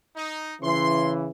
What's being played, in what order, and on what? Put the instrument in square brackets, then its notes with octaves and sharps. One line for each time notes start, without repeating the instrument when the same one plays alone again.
[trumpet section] D#4
[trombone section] C#3 E3 [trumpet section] C6